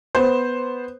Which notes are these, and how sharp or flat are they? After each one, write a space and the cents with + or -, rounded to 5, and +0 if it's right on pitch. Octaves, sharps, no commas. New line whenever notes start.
B3 +0 C5 +0